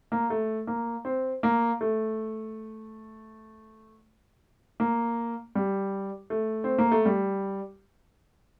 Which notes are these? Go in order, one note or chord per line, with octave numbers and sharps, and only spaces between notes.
A#3
A3
A#3
C4
A#3
A3
A#3
G3
A3
C4
A#3
A3
G3